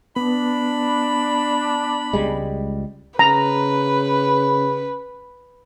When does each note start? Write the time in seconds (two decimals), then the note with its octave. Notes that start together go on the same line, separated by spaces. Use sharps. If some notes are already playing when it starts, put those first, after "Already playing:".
0.16 B3 D4 B5
2.13 C#2 G3 G#3
3.19 C#3 B4 A#5